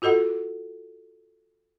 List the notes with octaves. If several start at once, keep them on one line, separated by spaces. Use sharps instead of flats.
F4 F#4 A4 D#5 F#5